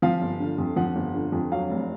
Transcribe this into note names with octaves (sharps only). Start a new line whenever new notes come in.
F3 F5
G1
D3
F2
F3 F#5
G1
D3
F2
F#3 F5
F1